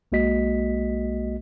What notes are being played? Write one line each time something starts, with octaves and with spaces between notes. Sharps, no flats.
B1 G#3 A#3 F#4 D#5 B6